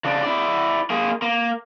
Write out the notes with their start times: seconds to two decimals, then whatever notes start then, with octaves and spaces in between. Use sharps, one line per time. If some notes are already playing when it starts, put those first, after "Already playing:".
0.05 C#3 D4
0.23 E4 D5
0.90 A#3 G#4
1.22 A#3